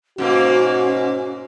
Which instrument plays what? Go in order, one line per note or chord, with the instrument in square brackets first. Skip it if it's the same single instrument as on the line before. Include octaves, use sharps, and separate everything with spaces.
[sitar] G#2 B2 A#3 [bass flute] C#4 [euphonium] F#4